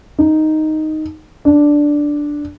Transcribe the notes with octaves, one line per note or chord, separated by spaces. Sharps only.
D#4
D4